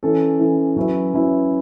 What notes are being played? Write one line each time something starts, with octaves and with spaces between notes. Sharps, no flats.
E3 C#4 A4
E3 C#4 A4
F#3 C#4 E4 B4 E5
F#3 C#4 E4 B4 E5